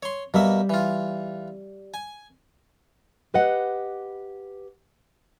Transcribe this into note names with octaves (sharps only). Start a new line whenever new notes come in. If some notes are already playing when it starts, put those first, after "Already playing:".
C#5 C6
B2 G3 A#3 E5
E3 F4
G#5
G4 B4 D#5 F#5